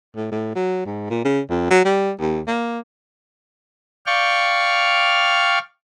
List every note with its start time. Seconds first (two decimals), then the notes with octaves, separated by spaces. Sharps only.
0.16 A2
0.32 A2
0.56 F#3
0.86 G#2
1.10 A#2
1.25 C#3
1.50 F2
1.71 F#3
1.85 G3
2.20 D#2
2.47 A#3
4.06 D5 F5 G5 C#6 F6